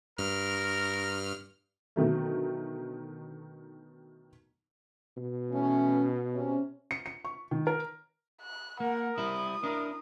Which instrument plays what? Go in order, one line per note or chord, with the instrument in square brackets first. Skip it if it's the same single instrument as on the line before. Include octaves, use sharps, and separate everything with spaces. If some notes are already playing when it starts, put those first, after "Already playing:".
[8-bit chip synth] G2 F6 [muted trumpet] A#4
[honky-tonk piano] B2 D3 D#3 F#3 A3
[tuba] B2
[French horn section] E3 A3 C#4
C3 C#4
[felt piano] C#7
C#7
C#6
D#3
A#4
[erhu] F#6
[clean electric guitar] A#3 [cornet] A#4 [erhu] F#5
[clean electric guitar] G3 E4 [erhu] D#6
[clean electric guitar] D4 E4 [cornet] A#4